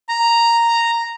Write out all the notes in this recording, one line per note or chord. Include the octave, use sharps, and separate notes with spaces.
A#5